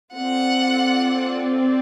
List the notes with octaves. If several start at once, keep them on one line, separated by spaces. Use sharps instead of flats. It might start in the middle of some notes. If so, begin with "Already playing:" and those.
C4 F4 A4 D5 F#5